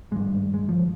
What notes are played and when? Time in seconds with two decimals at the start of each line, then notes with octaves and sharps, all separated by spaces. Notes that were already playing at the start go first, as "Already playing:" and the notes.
0.11 G#1 G2 G#3
0.54 G#3
0.69 F3